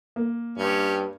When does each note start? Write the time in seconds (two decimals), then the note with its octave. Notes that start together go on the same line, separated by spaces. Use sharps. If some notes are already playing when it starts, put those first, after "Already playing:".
0.16 A#3
0.58 G2 C#4 G4